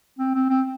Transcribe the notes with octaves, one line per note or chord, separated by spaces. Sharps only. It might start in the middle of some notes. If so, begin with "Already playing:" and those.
C4
C4
C4